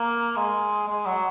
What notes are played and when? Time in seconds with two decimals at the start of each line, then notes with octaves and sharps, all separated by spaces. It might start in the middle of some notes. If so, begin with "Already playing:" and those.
Already playing: A#3
0.36 G#3
0.88 G#3
1.06 F#3